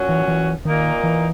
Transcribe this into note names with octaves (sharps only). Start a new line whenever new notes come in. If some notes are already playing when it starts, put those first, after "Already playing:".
Already playing: A#2 F#3 C#4 F#4
E3
E3
A#2 D#3 A#3 D#4
E3